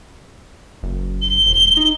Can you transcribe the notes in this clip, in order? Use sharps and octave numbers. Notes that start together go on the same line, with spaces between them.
F#1
G7
E1
D#4